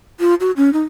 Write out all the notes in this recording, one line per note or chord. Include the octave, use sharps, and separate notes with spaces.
F4
F#4
C#4
D#4